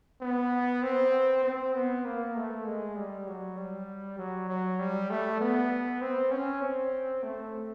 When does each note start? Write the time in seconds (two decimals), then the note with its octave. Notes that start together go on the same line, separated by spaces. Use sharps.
0.21 B3
0.83 C4
1.44 C4
1.74 B3
2.05 A#3
2.35 A3
2.65 G#3
2.96 G3
3.27 F#3
3.57 G3
4.18 F#3
4.49 F#3
4.79 G3
5.10 A3
5.40 B3
6.01 C4
6.32 C#4
6.62 C4
7.23 A3